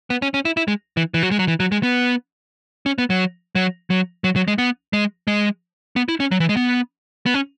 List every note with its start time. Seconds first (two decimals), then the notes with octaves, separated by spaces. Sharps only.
0.10 B3
0.22 C#4
0.34 C#4
0.45 E4
0.57 E4
0.68 G#3
0.97 E3
1.14 E3
1.23 F#3
1.31 G#3
1.39 F#3
1.48 E3
1.60 F#3
1.72 G#3
1.83 B3
2.86 C#4
2.98 B3
3.10 F#3
3.55 F#3
3.90 F#3
4.24 F#3
4.36 F#3
4.48 G#3
4.58 B3
4.93 G#3
5.27 G#3
5.96 B3
6.09 E4
6.20 C#4
6.31 F#3
6.40 E3
6.49 G#3
6.57 B3
7.26 B3
7.34 C#4